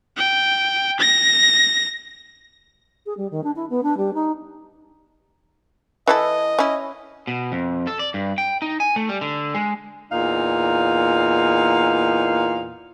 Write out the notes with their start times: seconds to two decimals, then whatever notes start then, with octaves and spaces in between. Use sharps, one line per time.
0.17 G5
0.99 A#6
3.06 G#4
3.17 G3
3.31 D#3
3.43 D4
3.55 E4
3.69 B3
3.83 D4
3.97 G3
4.13 D#4
6.07 E3 E4 A4 D#5
6.59 C#4 E4
7.27 B2
7.52 F2
7.87 A4
7.99 D5
8.14 G2
8.38 G5
8.62 D#4
8.80 G#5
8.96 A3
9.09 G3
9.21 D3
9.55 G#3
10.11 E2 A#2 D#4 F5